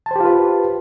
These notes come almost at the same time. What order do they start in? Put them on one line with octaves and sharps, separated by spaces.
A5 C5 G4 F4 B4